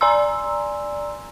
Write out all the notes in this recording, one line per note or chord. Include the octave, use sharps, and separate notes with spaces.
D5 G#5 A#5 C6 E6